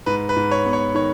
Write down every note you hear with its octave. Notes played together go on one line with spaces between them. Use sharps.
G#2 B4
B4
G#2
C#5
B3
C#5
D#3 C#5